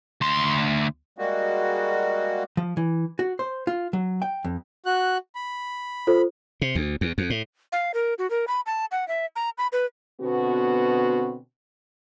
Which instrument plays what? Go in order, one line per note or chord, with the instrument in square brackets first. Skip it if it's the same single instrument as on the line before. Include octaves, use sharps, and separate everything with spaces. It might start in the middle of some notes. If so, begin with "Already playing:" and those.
[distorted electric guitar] D2 C6
[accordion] G3 G#3 A#3 F#4
[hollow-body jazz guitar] F3
E3
F#4
C5
F4
F#3
G5
F2
[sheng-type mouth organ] F#4 F#6
B5
[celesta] F4 A4 C5
[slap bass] C3
D2
E2
F2
A2
[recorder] F5
A#4
F#4
A#4
B5
A5
F#5
E5
A#5
B5
B4
[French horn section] B2 D3 B3 C4 F#4